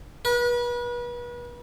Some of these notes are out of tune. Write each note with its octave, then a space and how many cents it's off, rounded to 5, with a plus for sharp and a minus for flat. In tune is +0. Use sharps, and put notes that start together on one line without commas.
B4 -35